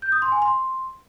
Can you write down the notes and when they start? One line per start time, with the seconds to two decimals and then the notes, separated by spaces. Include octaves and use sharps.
0.02 G6
0.12 D#6
0.22 C6
0.32 G#5
0.42 C6